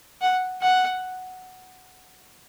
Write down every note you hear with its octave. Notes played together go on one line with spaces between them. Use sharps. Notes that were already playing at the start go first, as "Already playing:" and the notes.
F#5
F#5